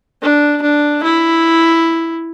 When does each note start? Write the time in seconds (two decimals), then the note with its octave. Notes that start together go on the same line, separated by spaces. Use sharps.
0.22 D4
0.62 D4
1.04 E4